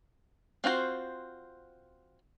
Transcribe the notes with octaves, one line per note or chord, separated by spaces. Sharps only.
C4 F4 F#4 C5